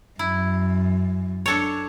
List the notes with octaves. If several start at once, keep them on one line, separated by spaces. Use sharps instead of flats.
F#2 E4
D4 A4 C#5